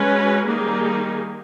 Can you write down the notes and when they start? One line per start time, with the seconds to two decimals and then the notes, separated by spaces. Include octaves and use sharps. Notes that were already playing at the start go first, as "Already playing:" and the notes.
Already playing: G#3 C#4 F#4 B4
0.47 D#3 G3 A#3 D#4 G#4